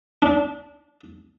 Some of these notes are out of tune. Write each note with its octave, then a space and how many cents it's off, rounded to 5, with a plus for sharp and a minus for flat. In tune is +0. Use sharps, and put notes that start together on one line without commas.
D4 -20